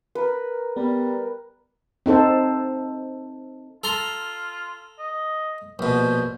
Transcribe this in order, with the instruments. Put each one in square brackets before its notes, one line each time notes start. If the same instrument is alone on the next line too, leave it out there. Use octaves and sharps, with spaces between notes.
[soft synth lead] A#4 [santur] B4
[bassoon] G3 [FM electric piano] B3
[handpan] C4 D#4 A4 C5
[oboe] F4 [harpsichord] A4 A#5 C6
[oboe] D#5
[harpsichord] A#1 B2 [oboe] C5